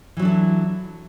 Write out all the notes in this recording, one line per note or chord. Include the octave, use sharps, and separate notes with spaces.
E3 F#3 D4 E4 A4